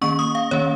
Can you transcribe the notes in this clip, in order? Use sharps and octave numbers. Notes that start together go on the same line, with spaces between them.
D#3 A#3 C#4 C#6
D#6
F5
D#3 A#3 C#4 C#5